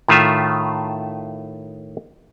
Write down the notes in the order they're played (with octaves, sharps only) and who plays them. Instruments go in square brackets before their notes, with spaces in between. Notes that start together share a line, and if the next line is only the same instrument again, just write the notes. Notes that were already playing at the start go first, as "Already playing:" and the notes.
[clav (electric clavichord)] A2 D#3 A3 F4 E5